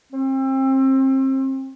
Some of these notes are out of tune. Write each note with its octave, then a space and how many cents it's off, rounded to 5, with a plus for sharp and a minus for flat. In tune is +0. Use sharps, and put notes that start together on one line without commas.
C4 +30